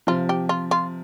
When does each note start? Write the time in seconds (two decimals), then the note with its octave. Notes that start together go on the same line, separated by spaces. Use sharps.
0.07 C3 F3 F4
0.29 G4
0.49 F4
0.71 F4